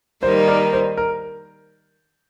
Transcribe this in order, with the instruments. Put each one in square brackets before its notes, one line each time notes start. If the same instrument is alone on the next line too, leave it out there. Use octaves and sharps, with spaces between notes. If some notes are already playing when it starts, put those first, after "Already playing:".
[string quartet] D#3 G3 A#3 D#4 [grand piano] C5
[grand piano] A#4 D5
C5
A#4